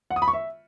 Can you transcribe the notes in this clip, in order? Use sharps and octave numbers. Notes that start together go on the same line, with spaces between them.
F#5
D#6
B5
C#6
E5